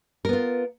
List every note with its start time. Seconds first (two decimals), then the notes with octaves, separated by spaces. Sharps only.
0.25 A#4
0.29 B3
0.33 F4